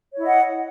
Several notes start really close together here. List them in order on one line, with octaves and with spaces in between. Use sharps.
C#5 E4 D#5 F#5